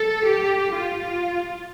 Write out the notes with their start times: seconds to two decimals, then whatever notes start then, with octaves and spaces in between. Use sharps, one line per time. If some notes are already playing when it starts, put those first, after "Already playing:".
Already playing: A4
0.25 G4
0.71 F4